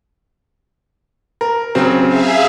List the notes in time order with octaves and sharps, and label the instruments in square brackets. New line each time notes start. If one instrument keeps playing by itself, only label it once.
[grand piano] A#4
C#3 F#3 C4
[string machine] G#4 E5 F5